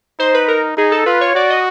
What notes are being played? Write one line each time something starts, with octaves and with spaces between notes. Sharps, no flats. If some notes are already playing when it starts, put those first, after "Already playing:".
D#4 C5
B4
A#4
D#4 G#4
A4
F4 B4
C#5
F#4 D5
D#5